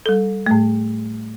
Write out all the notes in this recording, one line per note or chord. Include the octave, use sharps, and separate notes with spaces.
G3 A4
A2 A3